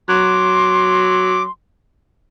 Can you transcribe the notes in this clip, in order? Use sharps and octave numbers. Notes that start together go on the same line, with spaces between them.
F#3 C6 D6